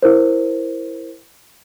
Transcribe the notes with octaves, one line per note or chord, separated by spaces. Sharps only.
E4 A#4 C5